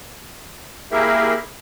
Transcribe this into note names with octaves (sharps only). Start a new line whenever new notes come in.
A#3 E4 G4 G#4 A#4 E5